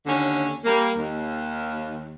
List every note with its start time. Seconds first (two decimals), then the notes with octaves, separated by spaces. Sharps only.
0.04 D#2 D3 C#4
0.63 G3 A#3
0.97 D#2